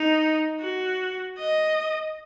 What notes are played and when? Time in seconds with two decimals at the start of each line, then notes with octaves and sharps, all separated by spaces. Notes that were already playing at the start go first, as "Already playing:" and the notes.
Already playing: D#4
0.60 F#4
1.38 D#5